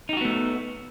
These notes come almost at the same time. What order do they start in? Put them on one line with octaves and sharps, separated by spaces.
D#4 G4 F#4 B3 A3